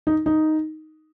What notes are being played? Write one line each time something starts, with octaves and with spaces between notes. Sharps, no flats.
D#4
D#4